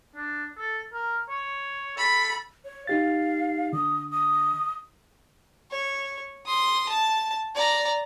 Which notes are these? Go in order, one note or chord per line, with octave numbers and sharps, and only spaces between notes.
D4
A4
A#4
C#5
A4 B5
C#5
D#4 G4 F5 A6
D3 D#6
D#6
C#5
C6 D#6
A5
D5 A#5